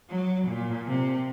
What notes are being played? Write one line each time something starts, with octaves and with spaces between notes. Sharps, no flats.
F#3
A#2
C3